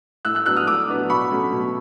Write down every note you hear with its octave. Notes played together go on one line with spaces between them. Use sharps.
A2 E6 F#6
E6 F#6
F#3 B3 D4 E6 F#6
D#6 F6
A2 D6 E6
F#3 B3 D4
B2 B5 C#6
F#3 A3 C#4
B2